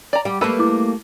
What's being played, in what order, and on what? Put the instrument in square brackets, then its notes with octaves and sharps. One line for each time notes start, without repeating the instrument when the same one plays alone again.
[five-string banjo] D5 A#5
[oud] G3 [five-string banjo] G5
[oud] G3 A3 A#3 [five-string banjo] A4 B4 B5
[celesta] E4 D6